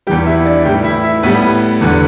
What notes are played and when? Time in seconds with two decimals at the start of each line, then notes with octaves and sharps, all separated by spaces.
0.07 E2 E3 G3 G4 G5
0.26 E4 E5
0.45 D4 D5
0.65 A2 E3 G3 G4 G5
0.84 E4 E5
1.04 E4 E5
1.23 A2 G3 B3 B4
1.81 E2 D3 G3